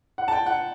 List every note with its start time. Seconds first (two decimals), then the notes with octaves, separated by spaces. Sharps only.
0.18 F#5
0.28 A5
0.33 G5
0.46 F#5